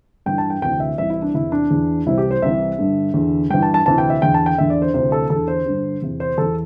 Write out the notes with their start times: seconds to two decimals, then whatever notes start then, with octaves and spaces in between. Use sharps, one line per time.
0.26 G2 E3 G5
0.38 A5
0.50 G5
0.62 D2 C3 E3 G5
0.80 E5
0.98 C2 C3 E3 E5
1.10 E4
1.22 D4
1.34 E2 C3 E3 E4
1.52 D4
1.70 E2 E3
2.06 C2 C3 E3 E4
2.18 G4
2.31 C5
2.42 C2 C3 E3 E5
2.78 G2 D3
3.14 E2 D3
3.50 G2 E3 G5
3.62 A5
3.74 A5
3.86 D2 C3 E3 A5
3.98 G5
4.10 E5
4.22 E2 D3 G5
4.34 A5
4.46 G5
4.58 E2 D3 E5
4.70 D5
4.82 C5
4.94 D2 C3 E3 C5
5.12 A4
5.30 E2 D3 A4
5.48 C5
5.66 G2 D3
6.02 E2 C3 E3
6.20 C5
6.38 E2 E3 A4